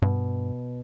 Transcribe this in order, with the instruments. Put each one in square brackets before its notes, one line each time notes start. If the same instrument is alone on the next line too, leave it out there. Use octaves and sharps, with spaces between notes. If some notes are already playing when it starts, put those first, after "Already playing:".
[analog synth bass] G2 [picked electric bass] B2